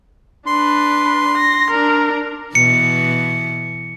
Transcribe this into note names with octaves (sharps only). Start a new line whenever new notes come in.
D4 B4 C6
A#6
D4 A#4
B2 E3 C#7